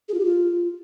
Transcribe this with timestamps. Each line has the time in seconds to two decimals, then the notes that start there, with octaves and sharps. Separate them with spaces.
0.09 G#4
0.14 F4
0.20 G4
0.25 F4